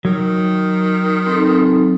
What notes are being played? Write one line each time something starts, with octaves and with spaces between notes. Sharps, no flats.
D#3 F#3
C4 D#4 A4